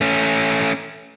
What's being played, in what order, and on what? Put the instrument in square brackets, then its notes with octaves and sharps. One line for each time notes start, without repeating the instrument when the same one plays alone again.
[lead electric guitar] A3 C#4